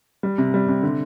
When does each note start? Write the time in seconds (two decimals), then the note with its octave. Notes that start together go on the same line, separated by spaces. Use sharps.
0.23 G3
0.38 C3
0.54 G3
0.68 C3
0.83 D3